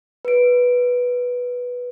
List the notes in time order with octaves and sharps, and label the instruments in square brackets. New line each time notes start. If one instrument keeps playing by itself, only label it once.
[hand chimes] B4 D7